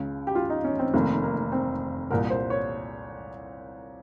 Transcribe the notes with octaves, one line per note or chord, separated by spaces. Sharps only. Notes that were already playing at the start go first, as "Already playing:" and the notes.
Already playing: C#2 C#3
G4
F4
D#4
C#4
C4
F1 F2 D#3 A#3
A#3
C4
C2 A#2 A#4
C5
C#5